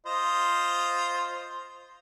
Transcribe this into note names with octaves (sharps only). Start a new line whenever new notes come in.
F4 C5 D#5